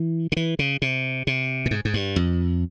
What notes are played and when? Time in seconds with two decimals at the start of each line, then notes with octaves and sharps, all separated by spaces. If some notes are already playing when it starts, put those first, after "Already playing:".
Already playing: E3
0.32 C#3
0.37 E3
0.59 C#3
0.82 C3
1.27 C3
1.66 A#2
1.71 G#2
1.85 G#2
1.94 G2
2.16 F2